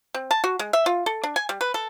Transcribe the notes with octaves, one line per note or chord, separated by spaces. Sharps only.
C4
A5
F#4
G#3
E5
F4
A4
D4
G#5
G3
B4
A4